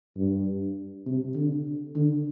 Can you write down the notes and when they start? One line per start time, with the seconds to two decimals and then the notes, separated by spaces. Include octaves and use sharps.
0.17 G2
1.06 C3
1.36 D3
1.96 D3